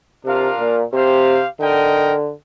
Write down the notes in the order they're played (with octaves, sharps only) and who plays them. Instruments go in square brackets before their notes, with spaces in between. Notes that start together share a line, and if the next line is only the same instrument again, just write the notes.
[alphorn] C3 [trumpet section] D4 F4 A#4 F5
[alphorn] A#2
[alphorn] C3 [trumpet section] C4 G4 C5 F5
[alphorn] D3 [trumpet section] D#4 A#4 D#5 G5